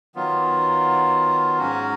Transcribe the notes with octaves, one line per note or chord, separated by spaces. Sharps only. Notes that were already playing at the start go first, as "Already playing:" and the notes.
D#3 F#3 B3 F4
G#2 F#3 C#4 F#4